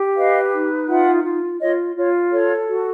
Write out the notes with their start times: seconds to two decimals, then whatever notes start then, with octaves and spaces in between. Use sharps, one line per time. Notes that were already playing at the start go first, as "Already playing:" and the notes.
Already playing: G4
0.17 B4 D#5 F5
0.52 D#4
0.88 F4 E5 F#5
1.24 F4
1.61 F4 C#5 D#5
1.96 F4 C#5
2.32 A4 C#5
2.68 F#4